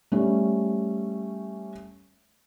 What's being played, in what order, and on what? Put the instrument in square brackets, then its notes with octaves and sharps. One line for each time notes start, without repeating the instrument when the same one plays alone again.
[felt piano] G3 A3 C#4